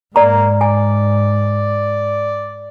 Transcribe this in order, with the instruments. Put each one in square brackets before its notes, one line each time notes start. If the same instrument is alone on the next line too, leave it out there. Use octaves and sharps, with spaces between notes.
[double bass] G#2 [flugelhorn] A#3 [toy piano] D5 A#5
[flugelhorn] D5 [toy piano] G#5